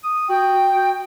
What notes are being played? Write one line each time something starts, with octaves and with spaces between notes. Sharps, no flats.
D#6
F#4 G5
F#4